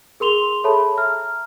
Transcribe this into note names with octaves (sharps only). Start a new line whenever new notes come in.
G#4 A#4 C6 F7 G7
G#4 A4 C#5 E5 A5 B5
E5 A#5 F6